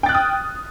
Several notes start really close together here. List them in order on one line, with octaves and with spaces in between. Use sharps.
G5 A6 F#6 F6 D#6